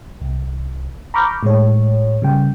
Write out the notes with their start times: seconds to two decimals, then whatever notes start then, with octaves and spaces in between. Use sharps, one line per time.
0.21 C2
1.14 A#5 B5 C#6 D6 F6 G6
1.43 A2 G#3 C#5
2.22 C#3 G3 G5